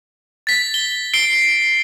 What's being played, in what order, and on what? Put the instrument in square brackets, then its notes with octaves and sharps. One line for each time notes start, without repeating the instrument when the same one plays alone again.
[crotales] A6 B6
G7
C7 D7 G7